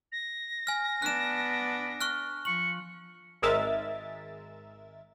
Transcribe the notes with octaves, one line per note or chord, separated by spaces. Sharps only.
A#6
G#5 F6
B3 D4 F#6 E7
C#6 F6 F#6
F3 C#6 F#7
G#1 G#3 A#4 E5 A6